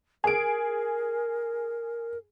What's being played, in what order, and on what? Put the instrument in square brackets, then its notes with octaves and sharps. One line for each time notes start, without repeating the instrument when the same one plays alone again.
[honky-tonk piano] G#4 D7 [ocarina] A#4